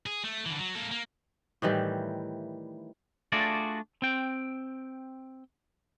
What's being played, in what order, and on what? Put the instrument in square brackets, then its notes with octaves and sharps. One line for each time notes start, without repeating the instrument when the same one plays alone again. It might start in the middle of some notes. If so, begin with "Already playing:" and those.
[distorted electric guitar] G#4
A3
D3 E3
F#3
A#3 A4
A#3
[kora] A2 D#3 E3 G3
[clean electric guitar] A3 D4 F4 F#4 G#4 D5
C4 G5